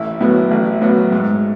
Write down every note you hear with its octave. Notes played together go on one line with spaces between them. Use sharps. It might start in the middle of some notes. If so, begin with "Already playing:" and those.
Already playing: A1 E4
A2 F#3 B3
A1
A2 F#3 B3
G#2